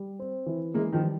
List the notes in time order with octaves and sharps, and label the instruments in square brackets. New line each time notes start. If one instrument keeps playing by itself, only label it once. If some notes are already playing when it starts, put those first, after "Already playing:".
Already playing: [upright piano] G3
C4
E3
[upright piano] E3 [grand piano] G#3 A#3
[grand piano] D#3 F3
[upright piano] G3